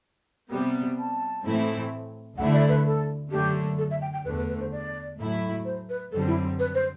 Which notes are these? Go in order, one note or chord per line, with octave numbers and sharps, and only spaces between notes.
C3 G3 B3
A5
A2 E3 A3 C4 E4
D2 D3 A3 E4 F#5
D5
B4
A4
F#2 D3 A3 G4
A4
E5
G5
G5
E2 D3 A3 B4
B4
B4
C5
D5
A2 F#3 A3 E4
C5
B4
F#2 D3 G3 C4 A4
E4
B4
C5